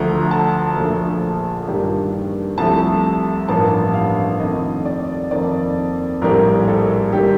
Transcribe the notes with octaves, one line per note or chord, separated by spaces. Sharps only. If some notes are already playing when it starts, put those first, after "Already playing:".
Already playing: D2 D3 F3 A3 A#5
A5
A#1 A#2 F3 A3
G2 D#3 G3 A#3
C2 C3 F3 A3 A5
A1 G2 F3 A#3 A5
F5
F2 D#3 A3 D#5
D5
F2 D#3 A#3 D5
A#1 A2 G3 A#3 A#4
A4
D#3 G3 A#3 G4